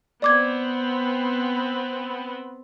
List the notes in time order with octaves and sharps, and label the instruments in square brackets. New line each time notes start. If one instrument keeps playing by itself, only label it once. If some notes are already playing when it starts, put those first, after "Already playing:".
[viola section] B3 C4 [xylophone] D5 D6 G#6